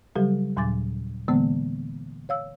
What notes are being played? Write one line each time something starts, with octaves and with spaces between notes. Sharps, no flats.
C#3 F#3 G3 G4 A4
D#2 A#2 F#3 G#5 D6 A6
A#2 D3 E3 G#3 A#3 B3
C#5 F5 E6